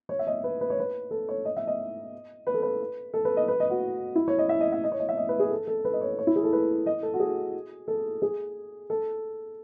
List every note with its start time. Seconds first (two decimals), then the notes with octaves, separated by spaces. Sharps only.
0.09 C#5
0.19 E5
0.27 D#5
0.44 B4
0.61 B4
0.70 C#5
0.80 B4
1.11 A4
1.29 C#5
1.45 D#5
1.57 E5
1.67 D#5
2.47 B4
2.54 A4
2.62 B4
3.14 A4
3.25 B4
3.37 D#5
3.48 B4
3.60 D#5
3.70 F#4
4.15 E4
4.28 C#5
4.38 D#5
4.49 E5
4.60 D#5
4.72 E5
4.84 D#5
4.92 C#5
5.00 D#5
5.09 E5
5.17 D#5
5.29 B4
5.40 G#4
5.50 A4
5.67 A4
5.85 B4
5.93 D#5
6.01 C#5
6.18 C#5
6.27 E4
6.36 G#4
6.43 A4
6.53 B4
6.86 D#5
7.03 A4
7.14 F#4
7.20 G#4
7.88 A4
8.22 G#4
8.90 A4